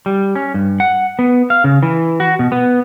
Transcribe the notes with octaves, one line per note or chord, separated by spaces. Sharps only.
G3
C#4
G2
F#5
B3
F5
C#3
E3
F#4
B2
B3